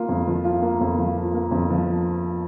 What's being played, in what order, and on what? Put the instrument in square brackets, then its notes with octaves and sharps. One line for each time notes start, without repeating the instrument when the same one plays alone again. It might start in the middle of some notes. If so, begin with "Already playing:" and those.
Already playing: [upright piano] A#3 F4
F2
F3
F4
A#3
F2
F3
F4
A#3
F2
F3